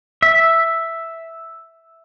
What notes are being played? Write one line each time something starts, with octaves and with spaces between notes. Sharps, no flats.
E5